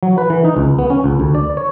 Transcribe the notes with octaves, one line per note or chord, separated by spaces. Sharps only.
F#3
B4
E3
D#4
C#2
B3
C#4
C#2
D2
D5
C#5